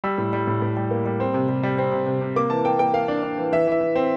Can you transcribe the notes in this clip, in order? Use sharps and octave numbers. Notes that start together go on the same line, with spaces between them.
G3 E6
A2
G3
A2
A2
G3
A#3
G3
C4
C3
G3
G3
C4
C3
C3
C3
A#3 D6
E3 A5
A#3 G5
A#3 G5
A#3 F5
D4
D4
E3
E3 E5
E3 E5
E3
C4